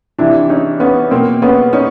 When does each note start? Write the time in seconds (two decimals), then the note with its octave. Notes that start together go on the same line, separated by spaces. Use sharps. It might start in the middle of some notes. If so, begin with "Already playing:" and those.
0.19 C3 E3 D4 E4
0.50 C#4 D#4
0.80 B3 C#4
1.11 B2 A#3 C4
1.42 B3 C#4
1.73 C#4 D#4